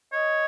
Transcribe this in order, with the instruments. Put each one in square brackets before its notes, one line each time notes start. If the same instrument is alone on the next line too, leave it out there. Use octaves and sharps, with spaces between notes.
[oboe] C#5 [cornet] D#5